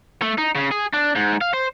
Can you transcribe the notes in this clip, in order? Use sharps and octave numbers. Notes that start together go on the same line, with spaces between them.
A3
D#4
C#3
G#4
D4
G#2
F5
C5